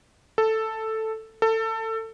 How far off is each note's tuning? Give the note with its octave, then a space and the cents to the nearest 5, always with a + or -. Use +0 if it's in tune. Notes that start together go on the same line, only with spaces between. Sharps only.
A4 +5
A4 +25